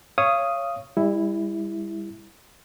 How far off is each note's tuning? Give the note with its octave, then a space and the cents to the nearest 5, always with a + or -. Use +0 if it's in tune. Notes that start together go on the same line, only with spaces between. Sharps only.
C#5 +0 F5 -30 D#6 +0
G3 +40 E4 +0